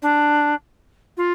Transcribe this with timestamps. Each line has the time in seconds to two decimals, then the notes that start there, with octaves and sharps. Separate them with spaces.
0.02 D4
1.17 F4